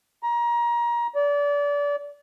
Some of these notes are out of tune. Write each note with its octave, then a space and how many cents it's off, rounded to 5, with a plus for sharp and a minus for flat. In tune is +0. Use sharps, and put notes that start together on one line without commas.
A#5 +25
D5 -30